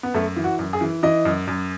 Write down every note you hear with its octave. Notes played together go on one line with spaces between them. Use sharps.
B3
F#2 A3
E3
F#4
F#2
G#4
E3
E3 D#5
F#2
F#2